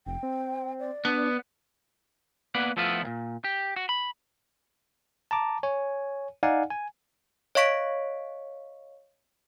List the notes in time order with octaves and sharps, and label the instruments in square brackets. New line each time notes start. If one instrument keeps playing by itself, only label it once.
[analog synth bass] F1 [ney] G5
[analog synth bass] C4
[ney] D5
[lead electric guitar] B3 [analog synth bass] D4
[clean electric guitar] A#3 B3 B4 D5 F#5
F3 A3 B3 E4 F4
D#2 A#2
G4
F#4
B5
[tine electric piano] A5 A#5 D6
C#5 G#5
D#4 D5 F5 F#5 G#5
G#5
[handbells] C#5 D#5 F5 C#6 B6 D7